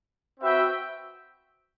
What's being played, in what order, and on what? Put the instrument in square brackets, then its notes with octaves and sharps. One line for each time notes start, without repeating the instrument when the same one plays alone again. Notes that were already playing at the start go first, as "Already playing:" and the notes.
[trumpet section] C4 F#4 B4 E5 G5